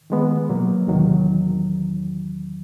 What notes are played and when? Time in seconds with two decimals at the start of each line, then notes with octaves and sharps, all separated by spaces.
0.10 D#3 G#3 B3
0.49 B2 F#3 A#3
0.87 E2 C3 D#3 F#3